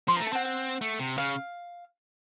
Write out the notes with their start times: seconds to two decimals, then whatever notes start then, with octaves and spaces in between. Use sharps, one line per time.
0.08 F3 C6
0.17 A#5
0.20 A3
0.27 A5
0.33 C4 F#5
0.45 F#5
0.81 A3
1.00 C3
1.18 C#3 F5